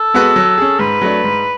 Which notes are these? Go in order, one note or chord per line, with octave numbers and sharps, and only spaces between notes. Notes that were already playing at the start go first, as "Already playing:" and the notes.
Already playing: A4
G#3 B3 F#4 B4
F#3
C#4 G#4
G#2 B4
F#3 A3 D4
G#2